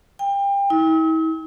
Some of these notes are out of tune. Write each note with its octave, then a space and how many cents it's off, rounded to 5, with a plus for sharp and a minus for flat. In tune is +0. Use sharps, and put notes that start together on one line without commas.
G5 +30
E4 -45